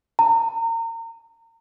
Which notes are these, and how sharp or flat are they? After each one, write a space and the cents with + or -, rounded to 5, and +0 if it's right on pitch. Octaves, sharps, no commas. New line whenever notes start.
A#5 -30